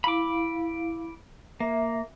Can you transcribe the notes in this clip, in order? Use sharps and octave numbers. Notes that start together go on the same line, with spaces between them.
E4 F5 B5 D6
A#3 E5